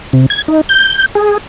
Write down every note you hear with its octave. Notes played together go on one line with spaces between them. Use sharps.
C3
G#6
D#4
G6
G#4